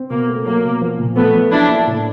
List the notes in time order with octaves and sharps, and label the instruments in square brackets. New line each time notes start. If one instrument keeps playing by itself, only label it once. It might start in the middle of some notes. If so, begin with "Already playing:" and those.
Already playing: [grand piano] C4
[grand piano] B2 [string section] A#3
[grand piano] A3
[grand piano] F#3 [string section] A#3
[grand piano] B2
F3
A#2
[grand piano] F3 [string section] A3 B3
[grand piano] F3
[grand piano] F#3 [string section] D4 E4
[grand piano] A#3
A2